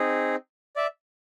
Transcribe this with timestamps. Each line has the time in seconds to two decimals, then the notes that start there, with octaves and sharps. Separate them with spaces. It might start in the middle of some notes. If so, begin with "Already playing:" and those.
Already playing: C4 D#4 G#4
0.76 D5 E5